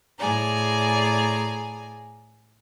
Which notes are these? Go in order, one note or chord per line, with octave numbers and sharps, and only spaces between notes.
A2 G#4 D5 G#5 A#5